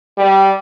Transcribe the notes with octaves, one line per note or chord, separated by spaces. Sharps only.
G3